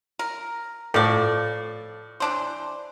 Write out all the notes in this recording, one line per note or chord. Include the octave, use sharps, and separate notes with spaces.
A#4
A2 F3 D5
E3 D4 C5